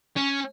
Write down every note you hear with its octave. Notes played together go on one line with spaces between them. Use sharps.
C#4